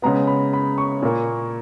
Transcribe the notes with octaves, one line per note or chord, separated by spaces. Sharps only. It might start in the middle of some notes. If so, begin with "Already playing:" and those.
C#3 G#3 B3 A#5
B5
B5
C#6
A#2 A#3